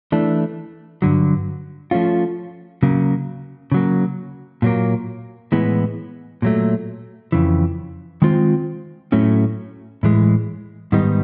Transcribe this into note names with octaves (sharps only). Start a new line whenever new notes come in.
E3 A3 D4
G2 D3 F#3
F3 A3 C#4 F4
C#3 F#3 A#3
C#3 F#3 A#3
A#2 F#3 A#3
A2 E3 G#3 B3
A#2 F#3 A3
F2 C#3 E3
D#3 G#3 C4 F4
A2 F#3 A3 C#4
A2 E3 G#3
G#2 D#3 G3 B3 D#4